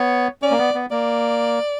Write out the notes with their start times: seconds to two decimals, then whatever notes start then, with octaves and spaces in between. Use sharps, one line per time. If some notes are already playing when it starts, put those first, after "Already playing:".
Already playing: B3 C#5
0.42 C#4 D5
0.51 A#3
0.59 B3
0.75 B3
0.91 A#3 D5